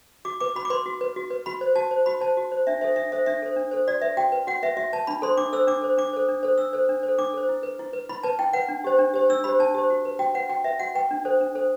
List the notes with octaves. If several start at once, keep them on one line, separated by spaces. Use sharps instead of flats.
F#4 D6
B4 D6
F#4 B5
D6
B4 C6
F#4
B4
F#4
B4
F#4 B5
C5
F#4 A5
C5
F#4 B5
C5 A5
F#4
C5
D4 E5
A4 C5 E5
D4 E5
A4 C5 E5
D4 E5
A4 C5
D4
A4 C5
F#4 D5
B4 E5
F#4 G5
B4
F#4 F#5
B4 E5
F#4 E5
B4 A5
D4 B5
A4 C5 C6
D4 D6
A4 C5 E6
D4 D6
A4 C5
D4 D6
A4 C5
D4
A4 C5
D4 E6
A4 C5
D4
C5
A4
D4 D6
A4 C5
E4
B4
E4
B4
E4 B5
B4 A5
E4 G5
B4 F#5
D4
G4 C5
D4
G4 C5
D4 E6
G4 C5 B5
D4 A5
G4 C5
F#4
B4
F#4 G5
B4 F#5
F#4 G5
B4 E5
F#4 F#5
B4 G5
D4
A4 C5
D4
A4 C5